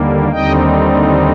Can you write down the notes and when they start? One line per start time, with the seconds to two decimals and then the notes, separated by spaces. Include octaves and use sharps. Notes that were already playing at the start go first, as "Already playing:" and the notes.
Already playing: D#2 D3 G3 A#3
0.31 D#2 D3 G3 C4 D#4 D#5 G5